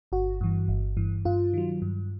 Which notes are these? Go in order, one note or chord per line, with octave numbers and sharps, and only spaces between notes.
G1 F#4
G2 E3
G1
G2 E3
G2 F4
D#3 F#3
G2